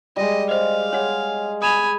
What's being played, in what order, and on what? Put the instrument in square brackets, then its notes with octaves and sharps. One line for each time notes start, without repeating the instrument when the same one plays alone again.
[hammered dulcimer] G3 G#3 [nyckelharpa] D#5
[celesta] C5 D#5 [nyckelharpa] F5
[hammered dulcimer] G#4 [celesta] C#5 F#5
[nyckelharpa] G#5 B5 [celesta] D#6 E7 F7